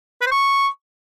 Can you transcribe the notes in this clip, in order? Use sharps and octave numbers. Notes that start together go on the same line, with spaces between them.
B4
C5
C#6